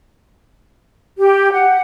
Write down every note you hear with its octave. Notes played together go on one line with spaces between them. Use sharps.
G4
F#5